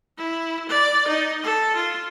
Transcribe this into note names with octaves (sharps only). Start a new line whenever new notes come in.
E4
D5
D#4
A4
F4